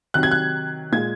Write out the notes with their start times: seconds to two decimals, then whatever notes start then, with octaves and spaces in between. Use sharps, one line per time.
0.14 C3 D#3 F#3 F#6
0.23 G#6
0.31 F#6
0.92 A#2 G#3 G#6